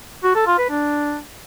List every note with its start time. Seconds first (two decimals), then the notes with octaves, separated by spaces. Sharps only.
0.24 F#4
0.35 A4
0.47 F4
0.58 B4
0.70 D4